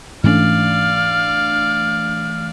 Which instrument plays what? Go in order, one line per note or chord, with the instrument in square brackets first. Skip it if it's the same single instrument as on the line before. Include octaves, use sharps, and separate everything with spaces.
[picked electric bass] G#2 C#4 [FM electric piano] E3 A3 D4 [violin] D5 F5 [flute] F6